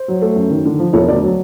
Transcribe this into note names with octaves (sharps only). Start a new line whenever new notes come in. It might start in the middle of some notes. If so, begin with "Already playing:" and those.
Already playing: C5
F#3
A3
F#2
D#3
D3
F3
E1 C#5
D2 D5
F#3